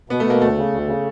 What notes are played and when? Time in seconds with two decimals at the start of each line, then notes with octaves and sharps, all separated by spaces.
0.10 B2 B3
0.20 A3
0.25 B2 A#3
0.40 D2 A3
0.57 C#3
0.72 D2
0.87 C#3